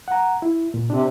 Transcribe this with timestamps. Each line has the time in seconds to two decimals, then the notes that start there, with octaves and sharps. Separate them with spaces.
0.08 F#5 A#5
0.42 E4
0.74 A#2
0.90 C3 D4